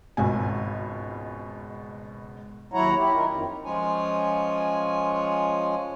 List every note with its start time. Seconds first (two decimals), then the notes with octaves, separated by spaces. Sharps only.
0.17 G#1 C#2 B2 G#5
2.74 D#2 F#3 E4 C#5 F#5 A#5
2.96 E4 G4
3.14 D#4 F4 A#4
3.29 F2 D#3
3.65 F3 G#3 C#4 F4 C#5 G#5